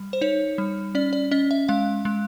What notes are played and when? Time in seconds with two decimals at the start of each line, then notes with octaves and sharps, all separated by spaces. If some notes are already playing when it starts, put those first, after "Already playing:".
Already playing: G3
0.13 C5
0.21 D#4 C#5
0.58 G3
0.95 C#4 D5
1.13 D5
1.31 C#4 D#5
1.51 E5
1.68 G#3 F5
2.05 G#3